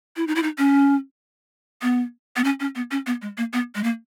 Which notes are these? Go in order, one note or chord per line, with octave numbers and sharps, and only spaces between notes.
E4
D#4
E4
D#4
C#4
B3
B3
C#4
C#4
B3
C#4
B3
G#3
A#3
B3
G#3
A#3